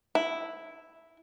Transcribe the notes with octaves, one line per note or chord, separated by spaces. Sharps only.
E4